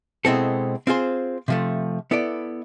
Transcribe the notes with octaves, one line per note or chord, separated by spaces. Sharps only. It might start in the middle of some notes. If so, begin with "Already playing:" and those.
B2 G#3 C4 E4 A4
C4 F4 G#4 C5
C3 F3 A3
B3 E4 A4 D5